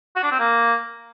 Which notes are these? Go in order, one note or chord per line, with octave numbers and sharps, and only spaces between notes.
F#4
D4
C4
A#3